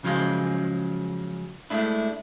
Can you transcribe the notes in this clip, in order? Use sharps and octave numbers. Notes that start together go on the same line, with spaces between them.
C#3 F3 F#3 G#3 F4
G#3 A3 D4 E4